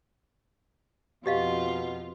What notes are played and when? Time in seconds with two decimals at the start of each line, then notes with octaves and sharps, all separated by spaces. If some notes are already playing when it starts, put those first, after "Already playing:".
1.26 F2 B2 F4 G4 D#5 F5